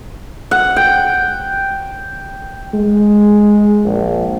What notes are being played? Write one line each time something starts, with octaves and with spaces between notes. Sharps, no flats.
F#5
G5
G#3
A#1